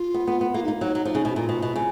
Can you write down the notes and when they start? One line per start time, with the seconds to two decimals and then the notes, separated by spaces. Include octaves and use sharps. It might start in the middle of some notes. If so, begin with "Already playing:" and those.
Already playing: F4
0.14 B3
0.27 B3
0.41 B3
0.54 A#3 F4
0.64 D#4
0.68 A#3
0.80 F#3 D#4
0.95 F#3
1.05 F3
1.15 C#3
1.25 B2
1.30 F#4
1.36 A#2 F4
1.49 B2
1.62 B2
1.76 C#3